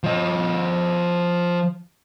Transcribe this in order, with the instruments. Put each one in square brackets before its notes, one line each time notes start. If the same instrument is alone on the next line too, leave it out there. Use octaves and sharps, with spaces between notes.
[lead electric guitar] F3 D#5